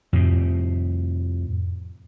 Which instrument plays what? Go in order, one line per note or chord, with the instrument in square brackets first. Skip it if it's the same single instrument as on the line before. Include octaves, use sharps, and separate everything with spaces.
[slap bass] F2 A2 C3